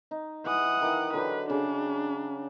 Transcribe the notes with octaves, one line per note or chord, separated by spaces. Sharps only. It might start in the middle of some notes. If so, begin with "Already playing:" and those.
D#4
E3 F#5 D#6
D#3 E3
D3 F#3 G4 B4
C#3 D4